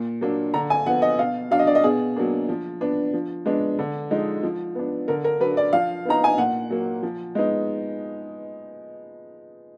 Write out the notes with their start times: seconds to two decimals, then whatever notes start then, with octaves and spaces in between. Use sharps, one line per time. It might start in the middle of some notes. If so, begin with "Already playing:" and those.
Already playing: A#2
0.21 F#3 A#3 D4
0.54 D3 A#5
0.70 G#5
0.86 F3 B3 F#5
1.02 D#5
1.19 B2 F5
1.51 F#3 D4 F5
1.59 D#5
1.67 D5
1.75 D#5
1.83 B2 G#4
2.16 F#3 A#3 D4
2.49 F3
2.81 B3 D4
3.14 F3
3.46 G#3 B3 D4
3.79 D3
4.11 F3 G#3 D#4
4.43 F3
4.75 B3 D4
5.08 D3 A#4
5.24 A#4
5.40 F#3 D4 B4
5.57 D5
5.73 F3 F5
6.05 B3 D#4 A#5
6.24 G#5
6.38 A#2 F#5
6.70 F#3 A#3
7.03 F3
7.35 G#3 B3 D#4